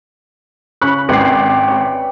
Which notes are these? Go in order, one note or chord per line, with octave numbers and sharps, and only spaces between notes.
C#3 B5 C#6 F#6
G#1 E3 G4 D5 C7
C#5 B5